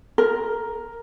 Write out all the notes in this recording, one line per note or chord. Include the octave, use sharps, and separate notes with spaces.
A#4